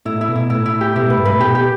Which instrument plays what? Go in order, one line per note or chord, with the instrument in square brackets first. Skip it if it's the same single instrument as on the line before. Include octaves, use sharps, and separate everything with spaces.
[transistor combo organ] A2 [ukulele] E4
[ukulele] E4
[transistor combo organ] B2
[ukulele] E4
[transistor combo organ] A2 [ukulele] E4
[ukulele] E4
G4
[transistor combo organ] B2 [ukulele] E4
[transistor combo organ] A2 [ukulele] B4
[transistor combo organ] G2
[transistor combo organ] A2 [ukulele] B4
[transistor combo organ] B2 [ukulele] G4
[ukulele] G4